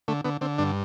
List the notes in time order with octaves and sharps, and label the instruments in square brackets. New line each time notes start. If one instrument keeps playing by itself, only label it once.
[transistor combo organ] D3 A3
D3 B3
D3 C4
G2 D4